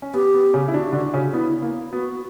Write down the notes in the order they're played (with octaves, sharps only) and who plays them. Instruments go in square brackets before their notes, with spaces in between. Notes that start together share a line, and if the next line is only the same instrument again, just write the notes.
[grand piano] C#4
[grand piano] B3 [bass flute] G4
[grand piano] B3
C#3 C#4
E4
[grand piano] D3 D4 [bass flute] F#4
[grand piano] D3 D4
C#3 C#4
[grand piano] B3 [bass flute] E4
[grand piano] A#3
[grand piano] B3 [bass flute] F#4